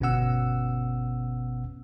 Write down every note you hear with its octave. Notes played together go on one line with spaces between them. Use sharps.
G1 B2 B3 C#4 F#5 E6